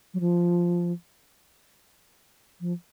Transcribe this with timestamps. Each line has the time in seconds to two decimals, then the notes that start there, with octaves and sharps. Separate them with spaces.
0.14 F#3
0.20 F3
2.61 F3